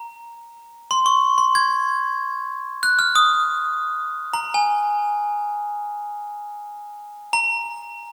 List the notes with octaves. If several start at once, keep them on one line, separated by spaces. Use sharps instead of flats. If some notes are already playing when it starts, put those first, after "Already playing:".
Already playing: A#5
C6
C#6
C6
G#6
F#6
F6
D#6
A#5
G#5
A#5